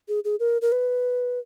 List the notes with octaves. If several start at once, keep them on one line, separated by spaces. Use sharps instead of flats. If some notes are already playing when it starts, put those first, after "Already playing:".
G#4
G#4
A#4
A#4
B4